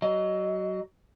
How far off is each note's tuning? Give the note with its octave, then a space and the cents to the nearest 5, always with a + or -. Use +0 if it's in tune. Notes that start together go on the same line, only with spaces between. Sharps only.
F#3 +25 D#5 +0